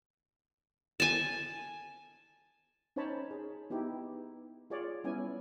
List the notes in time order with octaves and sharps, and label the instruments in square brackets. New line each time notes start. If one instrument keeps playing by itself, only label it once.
[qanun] G#5 A5
[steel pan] C#4 D#4 C5 C#5 A5 B5
G#4
B3 D#4 E4 G4
F4 G#4 C#5 D5
G3 B3 C#4 E4 G#5